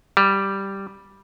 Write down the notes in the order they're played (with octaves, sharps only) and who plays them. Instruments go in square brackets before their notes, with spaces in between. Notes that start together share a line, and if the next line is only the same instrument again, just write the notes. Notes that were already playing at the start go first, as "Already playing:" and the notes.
[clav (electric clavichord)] G3